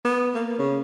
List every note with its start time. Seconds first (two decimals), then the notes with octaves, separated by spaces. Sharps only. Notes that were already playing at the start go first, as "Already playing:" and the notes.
0.05 B3
0.34 A#3
0.59 C#3